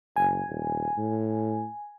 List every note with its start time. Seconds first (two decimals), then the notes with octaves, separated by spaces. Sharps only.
0.16 F#1 G#5
0.49 D#1
0.97 A2